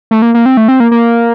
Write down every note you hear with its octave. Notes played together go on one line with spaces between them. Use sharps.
A3
A#3
A#3
C4
A3
C4
A#3
A#3